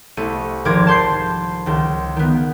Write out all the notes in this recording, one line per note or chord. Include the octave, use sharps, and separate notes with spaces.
C2 A3 D#7
G#1 F3 A#4 D6 G#6
A5 C6 G6 C7
C#2 D#3
D#3 B3